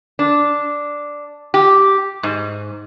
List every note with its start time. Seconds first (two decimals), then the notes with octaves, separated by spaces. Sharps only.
0.19 D4
1.54 G4
2.23 G#2